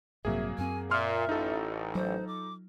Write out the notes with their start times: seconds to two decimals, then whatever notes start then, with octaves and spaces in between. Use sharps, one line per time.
0.25 A1 G2 C3 F#3 A#3 G#4 E5
0.58 F#2 C4 G#5
0.91 A#2 E5 C6 F6
1.29 A1 D#4 F4 A4
1.95 F#3 C5
2.27 D6